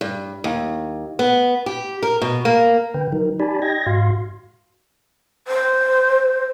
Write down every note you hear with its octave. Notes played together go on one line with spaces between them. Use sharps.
G2
D#2
B3
G4
A#4
B2
A#3
D3 B4 G5
F#3 D#4 A#4
D#4 G4 D5 G#5 A5 B5
D#5 G5 G#6 A#6
G#2 F#4 F5 C6
C5